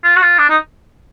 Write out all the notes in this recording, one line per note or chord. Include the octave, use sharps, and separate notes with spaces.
F4
F#4
F4
D4
D#4